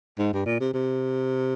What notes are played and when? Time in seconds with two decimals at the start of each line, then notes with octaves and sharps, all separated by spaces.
0.18 G#2
0.33 G2
0.46 A#2
0.60 C3
0.74 C3